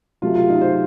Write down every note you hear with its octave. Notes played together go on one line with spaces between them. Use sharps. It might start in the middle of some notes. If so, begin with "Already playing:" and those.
C3 F#3 A3 F4
F4
D#4
C5